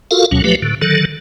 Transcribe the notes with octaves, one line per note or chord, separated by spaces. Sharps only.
F4 F#4 A4 A#4 F5
D2 B2 F#3 C#4
F3 F#3 A3 G4 B4
A2 D3
D3 D#3 F#3 A4